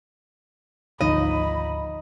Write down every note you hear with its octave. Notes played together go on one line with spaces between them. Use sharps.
G#1 D2 F3 D#4 D#5 B5